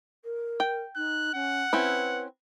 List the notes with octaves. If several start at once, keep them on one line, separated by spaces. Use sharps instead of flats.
A#4
G5
D#4 F#6
C#4 F#5
C4 C#4 E4 B4